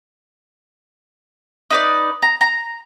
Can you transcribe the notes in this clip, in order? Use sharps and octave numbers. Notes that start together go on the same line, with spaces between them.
D#4 B4 D5
A#5
A#5